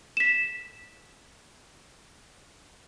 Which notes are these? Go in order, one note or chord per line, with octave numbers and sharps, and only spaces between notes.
B6 E7